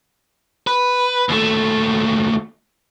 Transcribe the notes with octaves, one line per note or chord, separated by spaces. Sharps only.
B4
D#2 A3